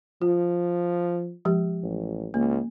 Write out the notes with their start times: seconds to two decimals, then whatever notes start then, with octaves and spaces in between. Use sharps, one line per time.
0.22 F3 F4
1.45 F3 G#3 G4
1.83 A1
2.34 C#2 A#3